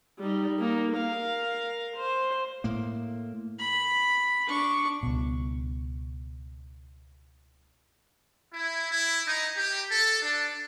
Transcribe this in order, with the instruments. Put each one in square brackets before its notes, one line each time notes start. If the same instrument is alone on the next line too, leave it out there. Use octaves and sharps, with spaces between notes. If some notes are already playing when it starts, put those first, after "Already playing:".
[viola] G3 D#4
A#3 D#4
A#4 F5
C5
[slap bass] A2 A#3
[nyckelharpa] B5
D4 C#6
[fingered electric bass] C#2 B2
[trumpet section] E4
E4
D#4
G4
A4
D4